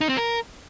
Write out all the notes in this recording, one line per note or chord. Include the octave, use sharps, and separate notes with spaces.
D#4
C4
A#4